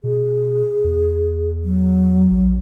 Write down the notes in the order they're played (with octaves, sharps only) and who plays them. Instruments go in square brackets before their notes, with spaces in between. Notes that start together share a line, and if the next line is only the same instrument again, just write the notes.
[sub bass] B2 [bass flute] G#4
[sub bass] E2
[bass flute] F#3
[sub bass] A#1